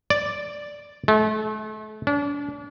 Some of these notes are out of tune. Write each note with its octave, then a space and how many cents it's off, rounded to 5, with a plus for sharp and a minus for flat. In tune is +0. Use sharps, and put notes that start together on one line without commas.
D5 -5
A3 -35
D4 -35